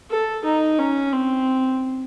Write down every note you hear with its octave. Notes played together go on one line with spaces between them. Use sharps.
A4
D#4
C#4
C4